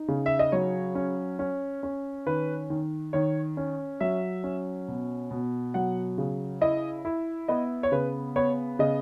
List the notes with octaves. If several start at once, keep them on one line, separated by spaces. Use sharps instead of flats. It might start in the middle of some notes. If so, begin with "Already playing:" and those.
Already playing: D#4
C#3
E5
D#5
F#3 C#5
C#4
C#4
C#4
D#3 B4
D#3
D#3 C#5
C#4
F#3 E5
C#4
B2
B2
F#3 F#5
C#3
E4 D#5
E4
B3 D#5
C#5
C#3 B4
B3 C#5
C#3 D#5